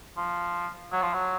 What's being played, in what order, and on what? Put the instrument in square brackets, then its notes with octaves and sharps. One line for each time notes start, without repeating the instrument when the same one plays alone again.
[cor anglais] F3
F#3
F3
F#3